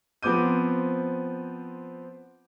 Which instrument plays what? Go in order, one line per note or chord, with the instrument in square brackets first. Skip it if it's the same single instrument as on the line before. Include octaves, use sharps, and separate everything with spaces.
[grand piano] F3 B3 C4 D6 G6 D#7